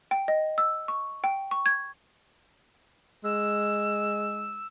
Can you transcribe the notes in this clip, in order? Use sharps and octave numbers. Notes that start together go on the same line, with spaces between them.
G5
D#5
E6
C#6
G5
C#6
G#6
G#3 E6